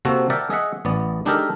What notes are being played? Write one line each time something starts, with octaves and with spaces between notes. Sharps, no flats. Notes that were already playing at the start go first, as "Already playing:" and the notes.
C3 A#3 C4 F#4 A4
A#4 D5 E5 F#5 G5 A5
G#4 D#5 E5 F#5
A1 B3 D5
G#3 D4 D#4 G4 A4 A#4